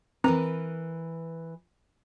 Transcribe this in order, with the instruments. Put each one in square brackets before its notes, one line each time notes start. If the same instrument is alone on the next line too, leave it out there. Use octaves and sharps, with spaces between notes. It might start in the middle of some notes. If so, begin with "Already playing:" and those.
[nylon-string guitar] E3 A#4 B4 [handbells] C4 A#5